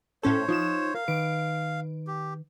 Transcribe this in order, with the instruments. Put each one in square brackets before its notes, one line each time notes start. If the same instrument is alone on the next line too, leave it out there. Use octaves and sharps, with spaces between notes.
[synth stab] A2 C#4 A4 [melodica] C5 C#5
[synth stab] F3 E7 [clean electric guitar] D#4 F4
[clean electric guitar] A#4 [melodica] F5
[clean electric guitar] D#3 B4 [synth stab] D7
[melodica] G4